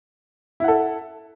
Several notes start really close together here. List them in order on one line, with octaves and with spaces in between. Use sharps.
E4 F#5 A4